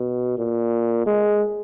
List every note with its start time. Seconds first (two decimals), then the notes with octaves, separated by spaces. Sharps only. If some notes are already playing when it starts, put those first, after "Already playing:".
Already playing: B2
0.38 A#2
1.06 G#3